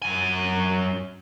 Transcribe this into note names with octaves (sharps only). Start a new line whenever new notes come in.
F#2 G#5